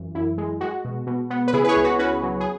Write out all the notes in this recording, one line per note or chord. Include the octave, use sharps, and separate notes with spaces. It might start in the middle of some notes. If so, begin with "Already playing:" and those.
Already playing: F#2 E3
F#2 E4
G#3
G#3 F#4
B2
B2
B3
B4
C#3 E4 G#4
B4
G#4 C#5
C#2
F#4 B4
C#4 F#4 B4
F#3
G#4